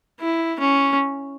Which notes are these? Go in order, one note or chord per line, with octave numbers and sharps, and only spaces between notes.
E4
C#4